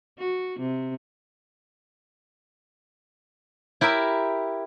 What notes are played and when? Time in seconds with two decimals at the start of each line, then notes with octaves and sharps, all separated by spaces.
0.19 F#4
0.59 C3
3.81 E4 G4 A#4 E5